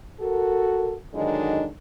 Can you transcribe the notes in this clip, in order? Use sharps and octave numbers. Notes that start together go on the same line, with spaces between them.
F#4 A4 A#4
D3 D#3 F#3 G#3 D4 D#4